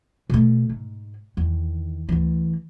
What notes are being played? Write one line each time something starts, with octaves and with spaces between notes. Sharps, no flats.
B2 A3
G#2
E2 D#3
D2 E3